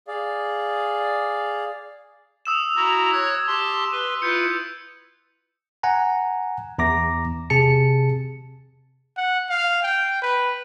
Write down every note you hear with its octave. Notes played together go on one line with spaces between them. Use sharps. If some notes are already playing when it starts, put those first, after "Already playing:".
G#4 D5 F5
D#6 E6 E7
E4 F#4 A#5
C#5 F#6 G#6
G4 A5 C6
B4 C6
E4 F4 B4 G6 C#7
F#5 G#5 A#5
E2 A#5 D6 A#6
C3 G#4 A5 C#7
F#5
F5
G5
B4